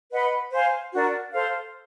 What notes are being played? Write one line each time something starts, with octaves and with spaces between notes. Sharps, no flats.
B4 D#5 F#5 B5
C5 F5 G#5
D4 F#4 A#4
A4 C5 F5